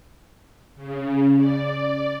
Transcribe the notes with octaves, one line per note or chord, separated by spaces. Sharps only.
C#3
D5